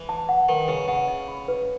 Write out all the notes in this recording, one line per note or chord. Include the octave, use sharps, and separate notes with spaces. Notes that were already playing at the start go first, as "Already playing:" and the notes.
Already playing: E3
A5
F#5
D#3 B4
C#3 B4
C#3 F#5
D#5
B5
B4